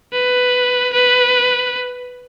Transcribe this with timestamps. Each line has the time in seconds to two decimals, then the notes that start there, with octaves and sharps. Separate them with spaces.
0.13 B4
0.93 B4